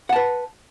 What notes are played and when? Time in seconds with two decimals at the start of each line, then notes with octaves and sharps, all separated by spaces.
0.09 F#5
0.13 A5
0.16 B4